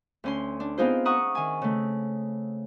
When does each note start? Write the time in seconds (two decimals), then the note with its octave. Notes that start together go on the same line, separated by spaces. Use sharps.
0.24 D2 C#4 C6
0.60 D4
0.78 B3 C4 D#4 F4 G#4 C5
1.05 E5 F#5 A#5 C#6 D#6
1.35 D#3 G#5
1.62 C#3 A3